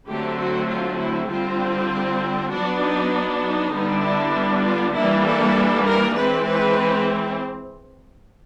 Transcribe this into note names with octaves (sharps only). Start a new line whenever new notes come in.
D3 F#3 A3 C4 G4
F#4
F4
E4
D3 G3 C4 F4
F#3 B3 D4 F#4
D#4
D#4
D3 G3 B3 D4
E4
F4
E3 G3 A#3 D4 E4
A4
A#4
E3 G#3 C4 B4
B4